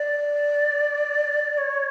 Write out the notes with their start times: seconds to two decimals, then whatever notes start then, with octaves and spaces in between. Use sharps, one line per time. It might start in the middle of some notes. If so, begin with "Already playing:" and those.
Already playing: D5
1.58 C#5